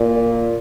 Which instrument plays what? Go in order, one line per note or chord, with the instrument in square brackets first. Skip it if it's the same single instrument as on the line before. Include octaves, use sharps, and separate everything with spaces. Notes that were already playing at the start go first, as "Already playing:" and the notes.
Already playing: [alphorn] A#2